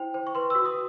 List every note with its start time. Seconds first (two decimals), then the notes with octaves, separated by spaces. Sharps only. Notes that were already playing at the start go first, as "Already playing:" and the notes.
Already playing: E4 C5 G5
0.14 C5
0.27 C#6
0.35 B4 C6
0.50 E6
0.55 F#4
0.66 D#6